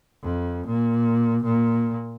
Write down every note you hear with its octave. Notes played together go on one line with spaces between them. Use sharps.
F2
A#2
A#2